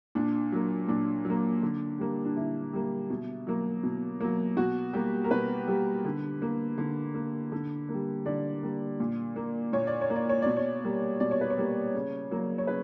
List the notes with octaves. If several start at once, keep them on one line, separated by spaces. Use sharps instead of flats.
A#2 D4
F#3 A#3
A#2 D4
F#3
A#3
D3
G3 A#3
D4
D3 E4
G3 A#3
B2
F#3 A#3
B2
F#3 A#3
B2 F#4
G3 A#3 G4
A#4
B2 B4
G3 A#3
D3
A#3
D3
A#3
D3
A#3
G3
D3 D5
G3 A#3
A#2
A#3
A#2 C#5
D5
C#5
A#3
D5
C#5
B2 D5
C#5
G3 A#3
B2 D5
C#5
B4
C#5
G3 A#3
C#3
F#3 A#3
C#5
C#3 B4